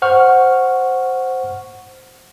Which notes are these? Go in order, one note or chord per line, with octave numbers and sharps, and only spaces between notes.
C5 F#5 C#6 F6